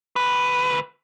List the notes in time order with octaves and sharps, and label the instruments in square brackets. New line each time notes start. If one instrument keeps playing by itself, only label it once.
[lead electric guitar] D2 B4